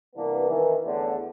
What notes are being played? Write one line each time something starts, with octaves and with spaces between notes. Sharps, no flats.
C2 C3 E3 A#3 B3 D4
D#3 E3
E2 A2 D3